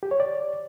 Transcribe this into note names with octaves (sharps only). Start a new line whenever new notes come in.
G4
C#5
D5